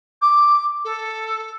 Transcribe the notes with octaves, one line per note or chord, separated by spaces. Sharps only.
D6
A4